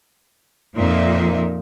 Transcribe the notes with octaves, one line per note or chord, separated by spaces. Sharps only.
F2 A#2 A#3 D#4 E5